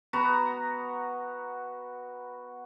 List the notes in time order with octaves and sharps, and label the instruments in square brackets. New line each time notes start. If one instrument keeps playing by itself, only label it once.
[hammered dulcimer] B3 F#4 A#5